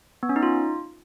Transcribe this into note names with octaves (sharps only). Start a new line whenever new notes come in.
B3
C#4
D#4
F4